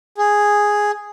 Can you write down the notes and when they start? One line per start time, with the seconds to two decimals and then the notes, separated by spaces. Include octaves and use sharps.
0.18 G#4